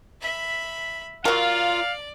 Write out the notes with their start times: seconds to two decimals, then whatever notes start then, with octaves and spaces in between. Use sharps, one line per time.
0.21 E5 B5
1.25 F#3 F4 A#4 D5 F5